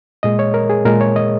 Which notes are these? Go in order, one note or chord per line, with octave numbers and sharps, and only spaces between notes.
A#2 G#3 D#5
C#5
A#4
G#4
A#2 G#3 A#4
C#5
D#5